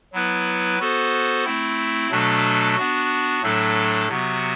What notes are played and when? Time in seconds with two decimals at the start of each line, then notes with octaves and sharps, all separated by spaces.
0.13 F#3 B3 E4 B4
0.80 B3 F#4 A4 C5
1.44 A3 C4 E4
2.11 B2 F#3 A3 D4 A4
2.76 B3 D4 F#4
3.43 A2 F#3 A3 D4 A4
4.09 C3 F#3 B3 F#4